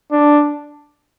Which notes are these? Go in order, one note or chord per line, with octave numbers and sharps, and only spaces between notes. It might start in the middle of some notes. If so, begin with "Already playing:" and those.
D4